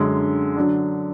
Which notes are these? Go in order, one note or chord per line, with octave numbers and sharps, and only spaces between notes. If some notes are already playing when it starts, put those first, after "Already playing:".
Already playing: F#2 D3 G#3
D3 F#3 D4